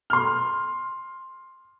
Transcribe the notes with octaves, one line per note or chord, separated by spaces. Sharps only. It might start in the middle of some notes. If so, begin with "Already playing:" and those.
C6 F6